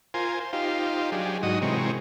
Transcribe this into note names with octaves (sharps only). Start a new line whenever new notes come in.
F4 A#4 C5 G#5
C5
D#4 F4 G4 C5 F5
F#3 D4 G4 G#4
G#2 F#3 D#4 F#4 D#5 D#6
C3 E3 G#3 C4 A#4 C#5